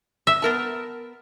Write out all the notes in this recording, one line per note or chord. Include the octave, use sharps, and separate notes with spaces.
E5
B3 A#4 A5